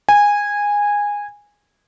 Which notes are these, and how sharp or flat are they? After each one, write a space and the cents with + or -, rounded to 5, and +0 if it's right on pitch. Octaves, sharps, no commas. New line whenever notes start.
G#5 -15